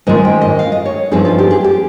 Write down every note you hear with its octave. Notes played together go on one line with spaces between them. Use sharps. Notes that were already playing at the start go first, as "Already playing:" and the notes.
G#2 D#3 G#3 C#4 F4 D#5
G5
D#5
F5
D#5
C#5
G2 F3 C4 D#4 G#4
F4
G4
G#4
G4